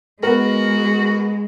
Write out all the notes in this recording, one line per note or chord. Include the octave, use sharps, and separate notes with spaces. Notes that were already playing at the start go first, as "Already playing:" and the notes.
G#3 B3 F#4 A#4